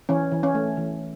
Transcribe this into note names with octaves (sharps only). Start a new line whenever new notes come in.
E3 C#4
E3
C#4
A3
E3